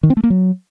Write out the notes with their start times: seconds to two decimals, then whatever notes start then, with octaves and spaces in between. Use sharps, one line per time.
0.03 D#3
0.10 C4
0.17 A3
0.24 A#3
0.30 F#3